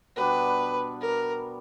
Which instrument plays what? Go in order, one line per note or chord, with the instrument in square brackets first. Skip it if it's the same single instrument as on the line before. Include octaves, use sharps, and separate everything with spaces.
[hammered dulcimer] B2 G3 B3 D4 [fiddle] B4
[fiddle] A#4